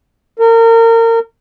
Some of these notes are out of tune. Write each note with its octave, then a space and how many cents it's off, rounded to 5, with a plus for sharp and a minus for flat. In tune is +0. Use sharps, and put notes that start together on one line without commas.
A#4 -30